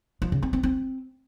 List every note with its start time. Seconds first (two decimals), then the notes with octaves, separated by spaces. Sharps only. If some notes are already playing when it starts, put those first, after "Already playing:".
0.22 F3
0.32 C#3
0.43 C4
0.53 C4
0.63 C4